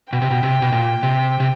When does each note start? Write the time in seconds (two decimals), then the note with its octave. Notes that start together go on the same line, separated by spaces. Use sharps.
0.13 B2 G5
0.22 C3
0.31 B2
0.43 C3
0.62 B2
0.72 A#2
1.03 C3
1.40 C3